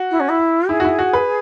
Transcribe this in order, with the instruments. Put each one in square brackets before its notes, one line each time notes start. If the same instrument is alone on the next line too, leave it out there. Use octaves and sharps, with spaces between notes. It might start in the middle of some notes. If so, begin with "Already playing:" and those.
Already playing: [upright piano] F#4
[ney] E4
C#4
E4
[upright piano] E4 [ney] G#4
[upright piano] F#4
E4
F#4
B4